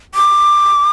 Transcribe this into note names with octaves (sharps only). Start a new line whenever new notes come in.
D6